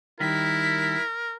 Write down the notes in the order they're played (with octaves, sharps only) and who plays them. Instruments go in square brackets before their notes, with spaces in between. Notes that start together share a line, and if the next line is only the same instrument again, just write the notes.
[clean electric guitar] D#3 G3 [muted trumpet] E4 [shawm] A#4 [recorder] B6